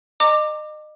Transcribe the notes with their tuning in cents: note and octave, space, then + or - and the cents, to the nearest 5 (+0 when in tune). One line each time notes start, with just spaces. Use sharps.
D#5 -30 A#5 -30 D6 +15